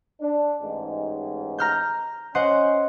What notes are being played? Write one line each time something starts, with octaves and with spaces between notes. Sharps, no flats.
D4
A1 G#2
A#5 F6 G6
C#4 C5 D#5 F#5